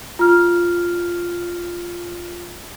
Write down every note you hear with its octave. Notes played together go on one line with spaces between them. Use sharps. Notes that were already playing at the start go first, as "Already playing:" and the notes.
F4 F6